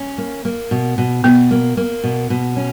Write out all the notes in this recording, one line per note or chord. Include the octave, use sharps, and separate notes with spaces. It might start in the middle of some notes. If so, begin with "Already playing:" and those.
Already playing: C#4
A#3
A#3
B2
B2
B2 B3
A#3
A#3
B2
B2
C#4